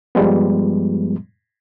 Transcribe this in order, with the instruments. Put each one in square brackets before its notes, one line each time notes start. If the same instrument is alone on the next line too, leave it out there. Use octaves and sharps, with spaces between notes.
[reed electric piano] G2 F3 G3 G#3 B3